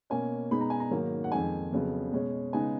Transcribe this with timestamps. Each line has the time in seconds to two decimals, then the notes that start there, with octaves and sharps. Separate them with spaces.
0.10 B2 A#3 C#4 G#5
0.51 B2 G#3 B3 D#4 B5
0.61 A#5
0.70 G#5
0.80 A#5
0.91 G#2 D#3 F#3 A#3
1.24 F#5
1.31 F2 D#3 G#3 G#5
1.72 F2 C#3 F#3 B3
2.12 B2 G#3 C#4
2.53 C#3 G#3 B3 D#4 G#5